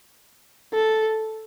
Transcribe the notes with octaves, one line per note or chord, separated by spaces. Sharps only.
A4